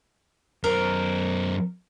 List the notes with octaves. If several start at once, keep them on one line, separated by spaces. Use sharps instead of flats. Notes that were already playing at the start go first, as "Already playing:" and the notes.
F#2 A#4 C5